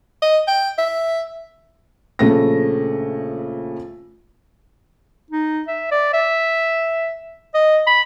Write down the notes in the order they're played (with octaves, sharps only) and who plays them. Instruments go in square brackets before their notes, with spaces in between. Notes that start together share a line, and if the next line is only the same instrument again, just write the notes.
[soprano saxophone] D#5
G5
E5
[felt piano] A#1 C#3 A3 A#6
[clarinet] D#4
E5
D5
E5
D#5
B5